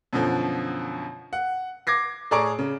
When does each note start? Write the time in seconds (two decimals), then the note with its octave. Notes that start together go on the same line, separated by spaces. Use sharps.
0.13 F#2 B2 D3 F3
1.33 F#5
1.87 D6 G#6 A#6 C7
2.31 A2 G#4 D5 A#5 C#6 D7
2.59 C#3